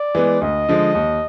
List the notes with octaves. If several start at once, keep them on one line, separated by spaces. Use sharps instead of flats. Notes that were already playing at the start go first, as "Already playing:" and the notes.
Already playing: D5
E3 G#3 B3
D2 D#5
D3 F3 G#3
D#2